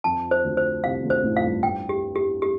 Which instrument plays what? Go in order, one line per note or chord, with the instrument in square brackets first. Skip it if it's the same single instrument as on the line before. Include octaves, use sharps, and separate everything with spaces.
[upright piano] F2 F3 [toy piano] A5
[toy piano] C5
[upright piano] D2 D3
[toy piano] C5
[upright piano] C2 C3 [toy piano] F5
[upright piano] D2 D3
[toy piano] C5
[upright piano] A1 A2
[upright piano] F2 [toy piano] F5
[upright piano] G2
[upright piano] G2 [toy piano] G5
[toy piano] G4
G4
G4